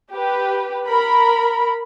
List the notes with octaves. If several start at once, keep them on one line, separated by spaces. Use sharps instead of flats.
G4 B4
A#4 B5